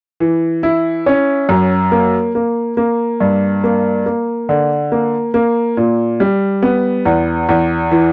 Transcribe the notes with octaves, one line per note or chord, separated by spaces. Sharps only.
E3
E4
C#4
F#2
A#3
A#3
A#3
G2
A#3
A#3
D3
A#3
A#3
A#2
G3
B3
E2
E2
E3